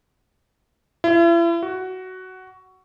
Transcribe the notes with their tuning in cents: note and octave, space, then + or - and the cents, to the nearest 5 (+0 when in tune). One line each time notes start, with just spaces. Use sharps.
E4 +40
F#4 +10